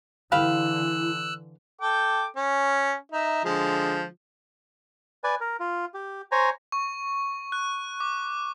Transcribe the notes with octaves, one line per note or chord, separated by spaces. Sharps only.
D3 E3 E4 G4 B4 F5 E6 F#6
A4 G5 D6
C#4
D#4 E5
D3 F3 G#3
B4 D5 G#5
A#4
F4
G4
C5 C#5 G#5 A#5
C#6
F#6
D6